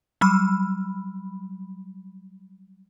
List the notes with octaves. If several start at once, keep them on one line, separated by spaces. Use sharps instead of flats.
F#3 G3 B5